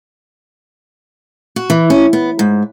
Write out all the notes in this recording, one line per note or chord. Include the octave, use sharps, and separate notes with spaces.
F#4
E3
C#4
B3
G#2